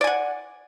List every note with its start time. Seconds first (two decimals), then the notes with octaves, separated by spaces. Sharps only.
0.01 D5
0.04 G#5
0.07 F#5